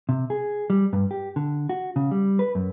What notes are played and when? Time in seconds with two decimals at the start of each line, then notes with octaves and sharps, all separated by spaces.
0.09 C3
0.30 G#4
0.70 G3
0.93 G2
1.11 G4
1.36 D3
1.69 F#4
1.96 C#3
2.11 G3
2.39 B4
2.55 F#2